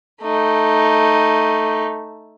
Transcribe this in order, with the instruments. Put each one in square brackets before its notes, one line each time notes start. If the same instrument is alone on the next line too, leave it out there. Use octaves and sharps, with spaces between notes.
[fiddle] A3 D#4